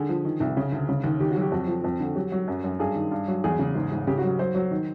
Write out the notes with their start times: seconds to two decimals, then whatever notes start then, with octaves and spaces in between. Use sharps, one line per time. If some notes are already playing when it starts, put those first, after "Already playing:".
Already playing: D3 G#4
0.09 F3
0.25 D#3
0.40 C2
0.57 C#3
0.72 D2
0.89 C#3
1.04 D#2
1.20 D#3 G4
1.31 F#4
1.36 F#3 G4
1.52 F2 F#4
1.67 F3
1.84 F2
2.00 D3
2.16 F#3 G4
2.32 F#3
2.48 F#2
2.64 F#2
2.79 G2 G#4
2.95 D#3
3.11 G2
3.28 F#3
3.44 E2 G#4
3.59 C#3
3.75 G#2
3.92 G#2
4.07 C#3 G4
4.18 F#4
4.23 F#3
4.39 F#3 C5
4.55 F#3
4.71 D#3